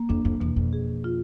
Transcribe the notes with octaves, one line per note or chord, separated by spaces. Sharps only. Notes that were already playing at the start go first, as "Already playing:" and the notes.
Already playing: A#3
F2 D4
F2
E2 B2
F2
G#4
F4